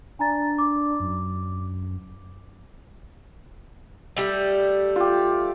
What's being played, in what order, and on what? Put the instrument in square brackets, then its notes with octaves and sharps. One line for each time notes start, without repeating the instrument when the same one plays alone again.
[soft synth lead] D4 [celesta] G#5 A#5 A6
[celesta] D6
[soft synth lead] F#2
[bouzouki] G3 A3
[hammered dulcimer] F4 G4